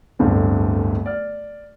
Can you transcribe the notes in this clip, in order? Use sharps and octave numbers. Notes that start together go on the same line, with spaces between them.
D1 G1 G2 D3 C4
D5 F6